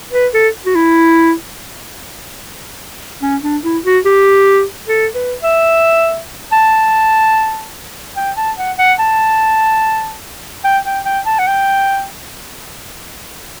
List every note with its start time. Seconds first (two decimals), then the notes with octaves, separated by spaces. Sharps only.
0.13 B4
0.34 A4
0.66 F#4
0.75 E4
3.22 C#4
3.43 D4
3.64 E4
3.84 F#4
4.05 G4
4.87 A4
5.15 B4
5.43 E5
6.52 A5
8.17 G5
8.37 A5
8.58 F#5
8.79 F#5
8.99 A5
10.64 G5
10.85 G5
11.06 G5
11.26 A5
11.39 F#5
11.47 G5